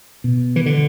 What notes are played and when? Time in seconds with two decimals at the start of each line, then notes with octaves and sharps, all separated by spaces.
0.24 B2
0.56 E3
0.66 D3